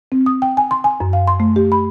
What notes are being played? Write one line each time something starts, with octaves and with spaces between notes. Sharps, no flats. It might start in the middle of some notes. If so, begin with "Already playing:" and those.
C4
D#6
G5
G#5
C6
G#5
F#2
F5
C6
A3
G4
B5